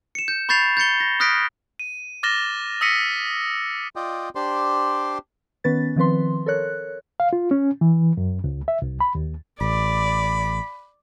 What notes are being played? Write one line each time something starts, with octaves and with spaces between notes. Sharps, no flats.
C#7 E7
G6
B5 C#6 G6 A6 C7 F7
G6 A6 C#7 G7
A#6
D#6 F6 F#6 A#6 B6 D7
D#7
D6 F6 A6 A#6 E7 G7
D#6 E6 A#6 B6 C#7 D#7
F4 D5 D#5 G5
D4 G4 C5 D5 C6
D#3 B3 C#4 B4 A6
D#3 F3 C4 B4 C6
A4 A#4 C#5 F#6
F5
F4
C#4
E3
F#2
C#2
E5
C2
B5
D#2
A1 D5 B5